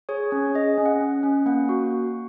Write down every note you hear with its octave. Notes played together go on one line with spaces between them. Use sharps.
G#4 C#5
C#4
G#4 D#5
C#4
F#5
C#4
C#4
A#3 F#5
F#4